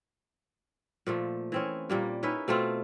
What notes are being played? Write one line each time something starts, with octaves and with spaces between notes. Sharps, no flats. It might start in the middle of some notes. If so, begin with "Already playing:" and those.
A#2 F3 A3
E3 C4 C#4
A#2 G3 A#3
C#4 D#4 E4 B4
B2 A3 C4 F4